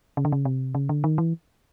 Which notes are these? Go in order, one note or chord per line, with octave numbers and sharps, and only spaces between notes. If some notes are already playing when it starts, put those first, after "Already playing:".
C#3
D3
C#3
C3
C#3
D3
D#3
E3